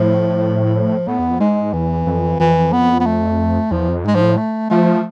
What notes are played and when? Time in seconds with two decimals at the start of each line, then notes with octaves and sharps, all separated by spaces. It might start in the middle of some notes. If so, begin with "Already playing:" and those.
Already playing: A2 F3
1.07 A2 B3
1.19 E2
1.31 F2
1.40 G#2 G#3
1.73 E2 E3
2.06 F2
2.40 F2 E3
2.73 B3
3.00 B3
3.06 A3
3.71 E2 F3
3.88 F2
4.04 G#2 G#3
4.15 F3
4.21 A2
4.37 A3
4.70 F3 A3